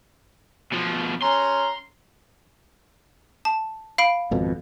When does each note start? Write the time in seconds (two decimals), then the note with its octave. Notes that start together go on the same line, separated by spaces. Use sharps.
0.73 B2 F3
1.23 C#4 A#5 C6
3.45 A5
3.98 F5 B5 D7
4.31 G#1 F2 B2